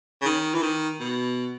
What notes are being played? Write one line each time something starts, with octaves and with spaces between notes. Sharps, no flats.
C#3
D#3
E3
D#3
B2